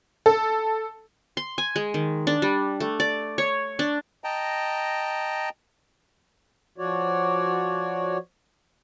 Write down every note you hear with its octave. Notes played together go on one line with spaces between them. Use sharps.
A4
C6
G#5
G#3
D#3
D4
G3
A3
D5
C#5
D4
D#5 G5 A5 A#5
F3 F#4 C#5 D5